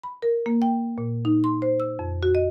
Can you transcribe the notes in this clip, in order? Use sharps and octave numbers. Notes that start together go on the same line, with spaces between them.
B5
A#4
A#3
G5
A#2
D#4
C6
C5
E6
F2
F#4
D#5